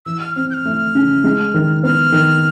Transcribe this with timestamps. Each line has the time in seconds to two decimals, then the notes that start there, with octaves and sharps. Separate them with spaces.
0.06 E3 E6
0.20 F6
0.35 C4 F6
0.50 G6
0.54 F6
0.65 A3
0.95 C#3
1.24 G#3
1.54 D#3
1.83 B3 F6
2.12 D#3